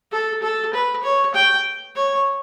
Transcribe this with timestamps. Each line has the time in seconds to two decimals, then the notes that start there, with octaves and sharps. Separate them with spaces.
0.11 A4
0.42 A4
0.73 B4
1.03 C#5
1.34 G5
1.96 C#5